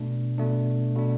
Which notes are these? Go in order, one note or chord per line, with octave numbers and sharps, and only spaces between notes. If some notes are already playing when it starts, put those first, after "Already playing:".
Already playing: B2 A3 D4
B2 A3 D4
B2 A3 D4